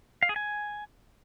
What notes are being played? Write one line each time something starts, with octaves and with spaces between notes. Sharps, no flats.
F5
G#4
G#5